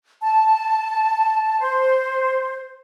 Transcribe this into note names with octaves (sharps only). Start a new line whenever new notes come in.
A5
C5